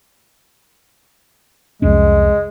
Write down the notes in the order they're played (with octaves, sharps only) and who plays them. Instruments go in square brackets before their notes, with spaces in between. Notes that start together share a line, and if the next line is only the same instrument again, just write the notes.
[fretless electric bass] C2 F2 C#4 [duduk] G#3